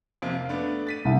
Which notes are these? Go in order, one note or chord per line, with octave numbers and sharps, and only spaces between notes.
F2 C3 A#3
F5
A3 B3 D4
A6 B6 D#7
C2